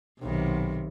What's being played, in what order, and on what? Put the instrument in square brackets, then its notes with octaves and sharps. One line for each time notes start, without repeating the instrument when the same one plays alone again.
[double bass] B1 [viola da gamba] C3 D#3